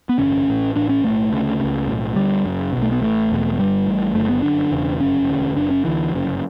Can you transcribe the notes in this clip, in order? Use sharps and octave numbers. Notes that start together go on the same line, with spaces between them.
B3
A1 G2 D3 C#4
A1 A2
A1 A2 D4
C#4
B1 A2 A3
D2 C#3
C#2 C#3
B1 A2
D2 D3 G3
F#1 F#2 C#3
B1 B2
A3
B3
A1 A2 A3
E1 E2 B2
G1 G2 D3 G3
A1 A2
F#1 F#2 D3 A3
B3
G1 F#2 D3 D4
E1 E2 C#3
G1 F#2 C#3 C#4
E1 D2 D3
F#1 F#2 C#3 D4
C#4
D2 D3 E3
G1 F#2 C#3